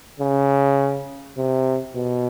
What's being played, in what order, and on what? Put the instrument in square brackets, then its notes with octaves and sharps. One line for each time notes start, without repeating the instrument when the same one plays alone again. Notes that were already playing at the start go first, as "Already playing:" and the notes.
[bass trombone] C#3
C3
B2